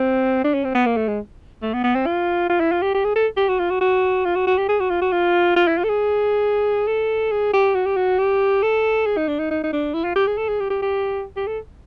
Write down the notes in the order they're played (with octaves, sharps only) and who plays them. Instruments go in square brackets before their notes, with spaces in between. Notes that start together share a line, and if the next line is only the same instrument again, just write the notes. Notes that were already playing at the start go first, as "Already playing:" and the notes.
Already playing: [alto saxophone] C4
D4
C#4
C4
B3
A#3
A3
G#3
A3
B3
B3
C4
F4
F4
E4
F4
G4
G4
G#4
A4
G4
F#4
F4
F#4
F#4
F4
F#4
F#4
G4
G#4
F#4
F4
F#4
F4
F4
E4
F4
A4
G#4
A4
G#4
G4
F#4
G4
F#4
G4
A4
G#4
D#4
D4
D#4
D#4
D#4
D4
E4
F4
G4
G#4
A4
G#4
G4
G4
G4
G4
A4